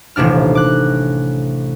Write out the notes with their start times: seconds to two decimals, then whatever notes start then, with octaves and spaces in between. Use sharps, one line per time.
0.16 D#1 A1 C3 D4 F6
0.55 D6 F#6